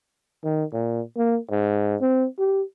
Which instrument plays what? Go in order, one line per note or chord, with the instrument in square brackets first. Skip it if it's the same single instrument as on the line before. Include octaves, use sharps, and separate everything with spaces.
[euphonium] D#3
A#2
A#3
G#2
C4
G4